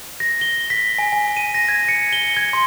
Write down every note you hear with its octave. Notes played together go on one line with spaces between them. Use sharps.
A#6
G7
B6
G#5
G#5
D#7
A#6
G#6
C#7
G7
G#6
C6